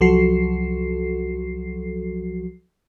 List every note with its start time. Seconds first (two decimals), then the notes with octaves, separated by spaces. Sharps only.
0.01 C2 F3 F#3 F#4 A4 C7